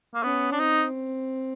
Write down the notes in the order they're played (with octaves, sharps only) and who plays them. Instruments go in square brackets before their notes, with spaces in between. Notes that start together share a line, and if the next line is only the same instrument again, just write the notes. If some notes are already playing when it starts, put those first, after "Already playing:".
[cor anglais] A#3
[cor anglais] B3 [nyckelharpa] C#4
[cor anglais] D4
[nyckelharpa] C4 [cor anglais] D#4